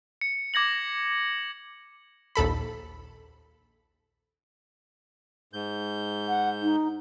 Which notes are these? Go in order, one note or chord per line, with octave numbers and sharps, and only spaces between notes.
C#7
D6 G#6 A#6 F#7
A#1 D#2 A4 B5
G#2 G6
F#5
D#4